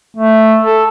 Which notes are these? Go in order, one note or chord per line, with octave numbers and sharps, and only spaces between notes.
A3
A4